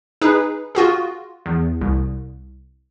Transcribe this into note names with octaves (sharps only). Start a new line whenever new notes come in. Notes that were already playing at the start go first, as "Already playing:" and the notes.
D#4 G#4 B4
F4 F#4 G#4
E2
C2